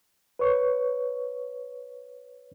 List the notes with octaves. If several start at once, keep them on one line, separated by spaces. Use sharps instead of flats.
B4 C#5 C#6